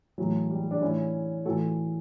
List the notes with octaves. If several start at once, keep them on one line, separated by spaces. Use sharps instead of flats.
A2 E3 F#3
G3
D4
A2 E3 C#4 E4
A2 E3 F#4 A4